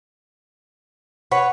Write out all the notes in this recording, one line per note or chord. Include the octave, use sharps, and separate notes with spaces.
B4 C#5 F#5